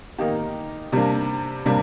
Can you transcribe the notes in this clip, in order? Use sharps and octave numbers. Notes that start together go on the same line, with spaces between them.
D#3 A#3 D#4 G4
C3 G3 A#3 D4
C3 G3 A#3 D4